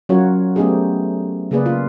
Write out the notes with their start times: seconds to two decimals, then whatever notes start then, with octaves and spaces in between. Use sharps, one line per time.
0.09 F#3 C#4 F4 F#4 A#4 C#5
0.56 A3 B3 C#4 D#4 G4 G#4
1.51 C#3 G#3 A#3 G#4 B4 D5
1.66 F4